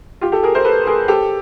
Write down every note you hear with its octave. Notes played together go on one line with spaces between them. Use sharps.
F4 G4
G4 A4
G#4 A#4
A#4 C5
A4 B4
G#4 A#4
G4 A4